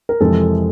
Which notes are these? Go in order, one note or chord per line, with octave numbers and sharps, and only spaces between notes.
A#4
F2 C3 E3 G#3 A4